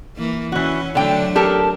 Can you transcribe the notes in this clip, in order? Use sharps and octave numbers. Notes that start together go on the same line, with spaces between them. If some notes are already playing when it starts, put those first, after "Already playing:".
E3 A#3
E3 C#4 F#4
D3 F#3 A3 D4 G5
G4 A4 A#4